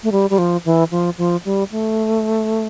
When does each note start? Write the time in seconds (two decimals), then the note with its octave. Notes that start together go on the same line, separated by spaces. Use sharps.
0.03 A3
0.12 G3
0.30 G3
0.38 F3
0.65 E3
0.91 F3
1.18 F3
1.45 G3
1.71 A3